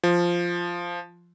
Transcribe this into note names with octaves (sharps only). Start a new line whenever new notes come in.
F3